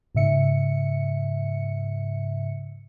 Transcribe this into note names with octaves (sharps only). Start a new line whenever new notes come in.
G#2 C#3 E5 C#7